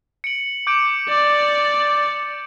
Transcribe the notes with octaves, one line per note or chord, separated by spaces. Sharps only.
C#7 D7 F#7
D6 G6 D7
D5